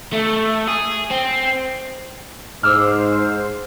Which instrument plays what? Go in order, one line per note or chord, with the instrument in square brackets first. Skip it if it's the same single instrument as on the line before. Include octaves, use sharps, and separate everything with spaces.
[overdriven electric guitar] A3
G#4
C4
[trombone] G#2 [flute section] C5 [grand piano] D6 E6 F6